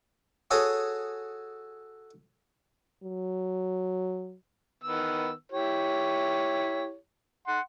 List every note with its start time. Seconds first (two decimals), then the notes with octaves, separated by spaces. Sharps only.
0.51 F#4 G#4 A4 C#5 D#6
3.03 F#3
4.84 D#3 B3 E6
5.52 E4 G4 C#5
7.47 F#5 C6